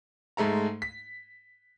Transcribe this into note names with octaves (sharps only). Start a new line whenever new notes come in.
G#2 G#3 A3 A#5
B6